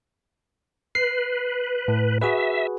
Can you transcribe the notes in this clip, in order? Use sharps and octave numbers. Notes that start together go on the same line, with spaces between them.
B4 C7
A2
F#4 G#4 B4 E5